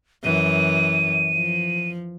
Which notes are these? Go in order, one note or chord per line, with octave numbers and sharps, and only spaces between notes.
F#2 E3 D#7
F3